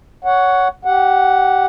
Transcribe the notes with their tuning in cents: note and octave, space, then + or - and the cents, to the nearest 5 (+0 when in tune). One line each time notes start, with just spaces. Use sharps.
C#5 +15 F#5 +0
G4 -20 F#5 +0